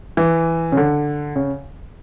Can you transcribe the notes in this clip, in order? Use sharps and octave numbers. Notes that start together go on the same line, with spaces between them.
E3
C#3
D3
C#3